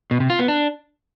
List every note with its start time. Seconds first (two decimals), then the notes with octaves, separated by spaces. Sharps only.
0.11 B2
0.20 C3
0.30 F4
0.39 B3
0.48 D4